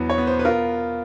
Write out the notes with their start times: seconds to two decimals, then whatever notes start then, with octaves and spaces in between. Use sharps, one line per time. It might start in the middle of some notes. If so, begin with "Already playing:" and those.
Already playing: E2 F#3 B3
0.10 C#5
0.18 B3
0.27 C5
0.39 B4
0.45 F4 A#4